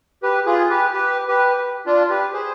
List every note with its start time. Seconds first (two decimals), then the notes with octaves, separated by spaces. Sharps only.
0.23 G4 B4
0.46 F4 G#4
0.70 G4 B4
0.93 G4 B4
1.28 G4 B4
1.86 D4 F4
2.10 G4 B4
2.33 G#4 C5